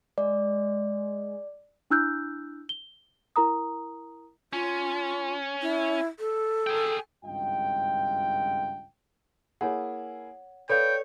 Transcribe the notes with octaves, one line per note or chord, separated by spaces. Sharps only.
G#3 D5
D4 E4 E6 F#6 G6
G7
E4 A#4 A#5 D#6
C#4 F4
E4
A4
G#4 G5
G#1 C#2 G2 F4 D#5 G5
A#3 E4 G#4 C#5 F#5
A4 B4 C#5 D5 F5 G5 G6